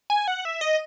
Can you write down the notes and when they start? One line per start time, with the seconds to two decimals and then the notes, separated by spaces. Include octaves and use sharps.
0.10 G#5
0.28 F#5
0.45 E5
0.61 D#5